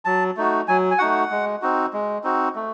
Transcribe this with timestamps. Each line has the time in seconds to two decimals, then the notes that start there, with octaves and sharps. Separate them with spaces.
0.05 F#3 A5
0.37 A3 D#4 F#4
0.68 F#3 G#5
0.91 G#5
0.98 A3 D#4 F#4 F#5
1.31 G#3
1.62 C4 D#4 F#4
1.93 G#3
2.24 C4 D#4 F#4
2.56 A3